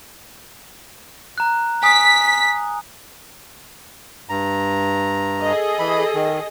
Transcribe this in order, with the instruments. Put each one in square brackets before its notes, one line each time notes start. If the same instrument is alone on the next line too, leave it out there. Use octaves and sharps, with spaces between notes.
[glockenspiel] A#5 F#6
[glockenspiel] G#5 D#6 [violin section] B6
[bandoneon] G2 A#5
[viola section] G#4 A4 D#5
[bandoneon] E3 B5
D#3